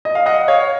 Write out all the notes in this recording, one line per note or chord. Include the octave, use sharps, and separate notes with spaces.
D#5
F5
D#5 F#5
C#5 F5